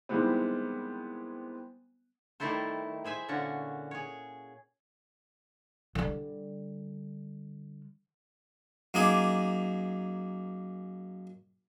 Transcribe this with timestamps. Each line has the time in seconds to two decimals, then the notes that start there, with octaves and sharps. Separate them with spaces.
0.09 D#3 E3 G3 G#3 B3 C4
2.40 D#3 G3 A3 E4 A4 C5
3.05 G#4 C5 E5 G#5
3.28 A#2 D3 C#4 F#4
3.91 G#4 C#5
5.95 D3 G3
8.94 F#2 A#3 D#4 G#4 D6